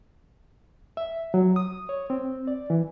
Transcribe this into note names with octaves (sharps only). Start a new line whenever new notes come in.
E5
F#3
D#6
C#5
C4
D5
E3